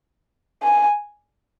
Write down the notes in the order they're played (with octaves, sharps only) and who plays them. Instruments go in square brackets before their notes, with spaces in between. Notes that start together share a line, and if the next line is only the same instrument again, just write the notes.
[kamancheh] G#5